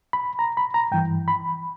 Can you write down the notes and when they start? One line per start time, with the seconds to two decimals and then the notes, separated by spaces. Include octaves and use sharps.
0.13 B5
0.39 A#5
0.57 B5
0.74 A#5
0.91 G2 E3 G5
1.28 B5